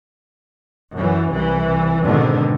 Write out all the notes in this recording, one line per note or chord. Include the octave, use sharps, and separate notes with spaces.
F#2 E3
C2 E3
F2 G#2 B2 D3 D#3